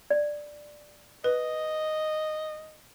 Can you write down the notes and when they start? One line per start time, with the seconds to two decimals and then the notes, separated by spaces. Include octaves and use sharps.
0.10 D5
1.24 B4 D#5